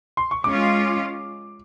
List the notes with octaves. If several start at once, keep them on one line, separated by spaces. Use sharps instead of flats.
C6
C#6
G#3 C#4 F4 D6